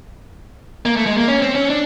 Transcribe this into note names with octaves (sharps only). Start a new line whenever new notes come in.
A#3
A3
G#3
A#3
C#4
C4
C#4
D4